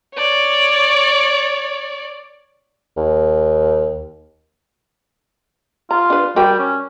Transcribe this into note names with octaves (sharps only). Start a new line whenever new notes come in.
C#5 D5
D#2
F4 A#5
D4 B4
G3 F#4 A#4 G5
C#4